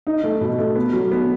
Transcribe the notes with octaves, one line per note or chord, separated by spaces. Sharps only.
D#4
A3
B2
A3
B3
F#3
B3